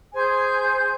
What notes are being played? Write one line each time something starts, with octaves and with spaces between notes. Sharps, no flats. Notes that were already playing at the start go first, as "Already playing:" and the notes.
G#4 C5 G#5 G6